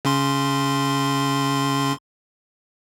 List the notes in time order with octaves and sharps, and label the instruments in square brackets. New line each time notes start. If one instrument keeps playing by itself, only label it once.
[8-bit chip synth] C#3 C#4 C6